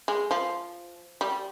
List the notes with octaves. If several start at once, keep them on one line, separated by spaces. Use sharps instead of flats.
G#3
F3
G3